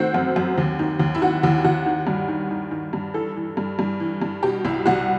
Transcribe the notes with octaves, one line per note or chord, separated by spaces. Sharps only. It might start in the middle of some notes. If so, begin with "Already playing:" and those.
Already playing: D#3 A3 C4 F#4
F#2
F#2
D#2
D#3
D#2
E4
D#3 F#4
D#2 E4
E4
D#2 F#4
D#3
G2
D#3
D#3
D#3
G2
E3 A4
E3
G2
G2
E3
G2
B2 G4
C2 E4
C2 F#4